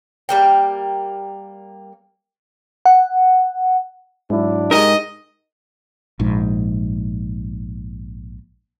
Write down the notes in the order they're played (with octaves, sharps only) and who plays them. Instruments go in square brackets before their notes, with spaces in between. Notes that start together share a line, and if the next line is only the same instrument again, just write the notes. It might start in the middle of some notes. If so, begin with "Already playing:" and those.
[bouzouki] G3 A#3 G5
[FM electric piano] F#5
[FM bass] G#2 [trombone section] F#3 D4 E4
[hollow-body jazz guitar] G#2 G4 A#4 [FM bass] D#4 [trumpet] D#5
[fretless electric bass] A#1 G#2